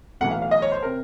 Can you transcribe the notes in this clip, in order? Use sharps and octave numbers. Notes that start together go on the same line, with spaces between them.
B1 A2 E3 F#5
F5
F5
D#5
C#5
C5
C3 A#4